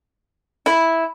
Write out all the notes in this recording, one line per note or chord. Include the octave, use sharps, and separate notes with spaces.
E4